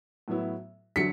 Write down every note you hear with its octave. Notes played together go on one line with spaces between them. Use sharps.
A2 F#3 B3 E4
D3 F#3 B6 C#7